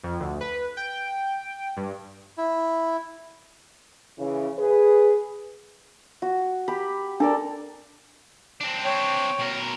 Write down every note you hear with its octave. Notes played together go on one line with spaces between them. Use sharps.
F2
D2
B4
G5
G2
E4
C#3 E3
G#4 B4
F#4
G4 B5
D4 A4 A#4 D5
C4 D4
C#5 G5
B2 A#4